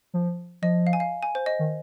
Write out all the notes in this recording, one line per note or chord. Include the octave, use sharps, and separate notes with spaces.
F3
F3 D#5
F5
G#5
F5
G#5
C5
D#5
D#3